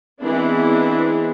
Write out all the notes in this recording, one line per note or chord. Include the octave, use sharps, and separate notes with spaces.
E3 G#3 B3 C4 D4 E4